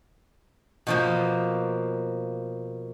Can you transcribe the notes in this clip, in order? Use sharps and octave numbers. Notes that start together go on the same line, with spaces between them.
B2 F3 A#3